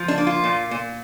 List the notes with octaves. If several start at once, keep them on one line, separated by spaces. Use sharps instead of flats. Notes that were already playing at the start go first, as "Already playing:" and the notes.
Already playing: F3
D4
A#3
F4
A#2
A#2